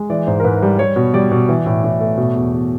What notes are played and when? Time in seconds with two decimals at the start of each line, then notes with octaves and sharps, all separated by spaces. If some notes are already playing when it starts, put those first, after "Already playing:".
Already playing: G#3
0.10 E3 D5
0.27 G#2 C5
0.40 A#4
0.44 G#2 B4
0.62 G3
0.79 G3 C#5
0.96 B2
1.14 G3 D5
1.31 B2
1.49 E3
1.66 A2
1.84 A2
2.00 A3
2.17 B2
2.35 E2
2.53 E2